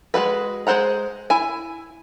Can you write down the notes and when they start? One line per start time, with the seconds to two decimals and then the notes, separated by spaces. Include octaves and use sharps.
0.14 G#3 A3 F#4 B4
0.67 G#3 D#4 C5 F#5 A#5
1.30 E4 G#5